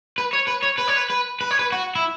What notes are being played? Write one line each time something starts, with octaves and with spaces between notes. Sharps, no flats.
B4
C#5
B4
C#5
B4
C#5
B4
B4
B4
C#5
B4
F#4
E4